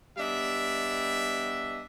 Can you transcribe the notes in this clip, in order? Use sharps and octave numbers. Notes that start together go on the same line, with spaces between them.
G3 B3 D4 D#5 E5